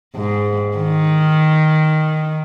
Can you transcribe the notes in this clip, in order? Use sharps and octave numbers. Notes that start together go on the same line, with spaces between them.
G#2
D#3